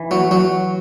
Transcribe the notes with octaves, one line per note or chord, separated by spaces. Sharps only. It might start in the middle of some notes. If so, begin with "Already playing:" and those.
Already playing: E3
F#3
F#3